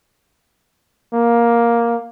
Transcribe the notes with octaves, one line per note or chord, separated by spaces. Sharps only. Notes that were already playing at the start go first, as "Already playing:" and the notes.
A#3